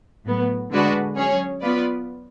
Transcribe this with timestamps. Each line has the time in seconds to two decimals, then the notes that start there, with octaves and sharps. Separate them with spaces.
0.25 A2 F#3 B3
0.71 D3 G#3 D4 F#4 B4
1.16 F#3 C#4 G#4 C#5
1.62 B3 F4 B4 D5